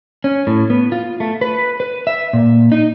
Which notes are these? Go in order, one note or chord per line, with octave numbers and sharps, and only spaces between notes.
C#4
A2
B3
F4
A3
B4
B4
E5
A#2
D#4